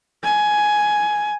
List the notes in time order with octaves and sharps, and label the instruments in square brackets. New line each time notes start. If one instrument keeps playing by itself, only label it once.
[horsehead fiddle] G#5